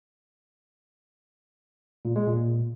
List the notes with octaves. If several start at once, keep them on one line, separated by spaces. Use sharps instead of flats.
A#2
G#3
A#2